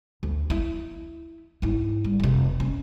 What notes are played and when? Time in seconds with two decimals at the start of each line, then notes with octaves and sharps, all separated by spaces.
0.23 D2
0.50 E4
1.62 G#2 E4
2.04 G3
2.20 F1 C3
2.60 C#4